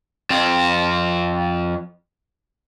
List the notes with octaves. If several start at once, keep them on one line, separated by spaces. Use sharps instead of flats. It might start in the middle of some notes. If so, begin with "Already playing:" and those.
F2 C4